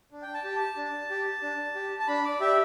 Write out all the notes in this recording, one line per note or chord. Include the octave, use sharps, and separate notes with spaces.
D4
G5
A5
G4
A5
D4
G4
D4
G4
A5
D4 B5
D5
G4 E5